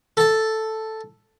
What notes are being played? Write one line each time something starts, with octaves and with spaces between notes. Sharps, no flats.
A4 A5